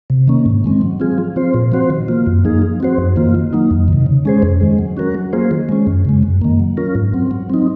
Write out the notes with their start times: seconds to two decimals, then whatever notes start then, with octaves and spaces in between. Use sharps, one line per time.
0.10 C3
0.28 D#3 A#3 C#4
0.46 G#2
0.64 D#3 G#3 C4
0.81 F#3
1.00 C4 F4 G#4
1.18 F3
1.36 C4 F4 C5
1.54 A#2
1.72 F3 C4 F#4 C5
1.90 D#3
2.08 A#3 F4
2.27 F#2
2.44 F3 A#3 D#4 G#4
2.62 F3
2.80 C4 F#4 C5
2.98 F#2
3.16 D#3 A#3 F4
3.35 D#3
3.53 F#3 A#3 D#4
3.71 F2
3.88 C3 D#3
4.06 C#3
4.25 G#3 C#4 G#4 C5
4.42 F2
4.61 D#3 G#3
4.79 F#3
4.97 C#4 F#4 A#4
5.15 F#3
5.33 A#3 F4 G#4 C5
5.51 D#3
5.69 G#3 C#4
5.87 F#2
6.05 C#3 G#3
6.23 F#2
6.42 D#3 A#3
6.60 F#3
6.77 C#4 F4 A#4
6.95 G#2
7.13 F#3 C4
7.31 F#3
7.50 C4 D#4